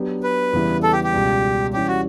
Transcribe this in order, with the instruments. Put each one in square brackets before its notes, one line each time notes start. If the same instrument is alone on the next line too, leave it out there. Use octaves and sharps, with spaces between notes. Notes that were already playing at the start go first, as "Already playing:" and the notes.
Already playing: [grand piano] F#3 B3 D4 G4
[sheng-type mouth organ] B4
[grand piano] E2 C#3 G3 B3 E4
[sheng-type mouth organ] A4
G4
G4
[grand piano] C#2 B2 G3
[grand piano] E3 G3 C#4 [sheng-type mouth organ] G4
[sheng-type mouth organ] F#4